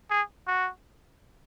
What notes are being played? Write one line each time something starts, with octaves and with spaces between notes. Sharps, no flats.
G#4
F#4